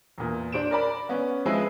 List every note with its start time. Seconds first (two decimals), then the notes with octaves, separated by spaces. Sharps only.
0.18 E2 A#2
0.52 D4 C5 D7 E7
0.71 A#4 D5 B5
1.09 B3 C#4
1.45 F3 G#3 C4 E4 B4 E5